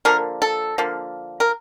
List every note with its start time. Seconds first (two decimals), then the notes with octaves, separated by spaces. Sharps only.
0.05 D3 F3 A#3 A#4
0.42 A4
0.78 D3 F3 A#3
1.40 A#4